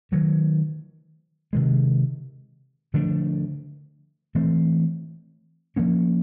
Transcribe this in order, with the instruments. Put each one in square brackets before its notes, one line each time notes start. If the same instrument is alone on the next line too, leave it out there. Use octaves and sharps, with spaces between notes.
[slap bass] D#3 F#3 A3
C3 D#3 G#3
D3 F3 A3 D4
E3 A3 C4
F3 A#3 C#4